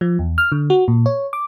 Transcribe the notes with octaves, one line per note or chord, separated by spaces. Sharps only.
F3
E2
F6
D3
F#4
A#2
C#5
D6